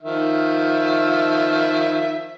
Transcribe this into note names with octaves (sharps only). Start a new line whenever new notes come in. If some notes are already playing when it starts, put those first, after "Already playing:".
D#3 F3 E5